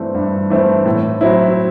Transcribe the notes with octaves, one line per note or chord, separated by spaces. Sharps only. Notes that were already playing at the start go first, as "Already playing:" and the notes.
Already playing: G2 E3 A3 C4
G2
E3 A3 C4
A2
F#3 C4 E4